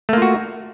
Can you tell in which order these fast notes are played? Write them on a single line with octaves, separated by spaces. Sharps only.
A3 A#3 F4 F#4